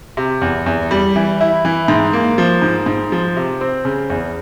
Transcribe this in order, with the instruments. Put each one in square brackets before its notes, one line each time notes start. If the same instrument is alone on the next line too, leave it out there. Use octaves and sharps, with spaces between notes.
[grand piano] C3
E2
E2
G3
E3
E4
E3
G#2
A#3
F3
G#2
G#2
F3
C3
C4
C#3
E2